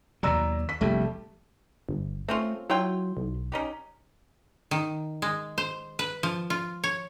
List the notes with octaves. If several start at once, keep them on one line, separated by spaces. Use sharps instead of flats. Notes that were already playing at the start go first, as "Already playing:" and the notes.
D#2 B2 F#3 D5 A#5 E6
B6
F1 A#1 F2 G3 A3
G1
A3 C4 C#4 F4
F#3 E4 F4 G5
B1
C#4 D#4 G4
D#3
G#3
C5
B4
F3
F4
C#5